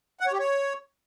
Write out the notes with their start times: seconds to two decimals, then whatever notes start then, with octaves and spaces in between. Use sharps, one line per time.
0.20 F#5
0.27 C#5
0.33 G4
0.39 C#5